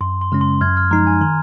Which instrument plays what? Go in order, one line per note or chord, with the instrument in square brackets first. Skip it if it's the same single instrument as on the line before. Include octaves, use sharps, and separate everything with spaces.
[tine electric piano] F#2 [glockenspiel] C6
[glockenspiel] C6
[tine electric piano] C#3 G#3 C#4
[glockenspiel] C6
[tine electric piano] F#2 [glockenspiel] F6 G#6
[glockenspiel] F6 G#6
[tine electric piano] F3 G#3 D#4 [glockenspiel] A#5
[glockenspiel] G#5
[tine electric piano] D#3 [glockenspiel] A#5